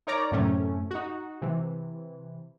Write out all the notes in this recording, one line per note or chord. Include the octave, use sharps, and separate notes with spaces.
D#4 A#4 C#5 D5 A#5
F#2 A2 C3 A3 C#4
D#4 F#4
C3 E3